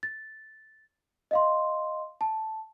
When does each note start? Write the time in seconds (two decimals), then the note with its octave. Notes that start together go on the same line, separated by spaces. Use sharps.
0.03 A6
1.31 D#5 F5 C6
2.21 A5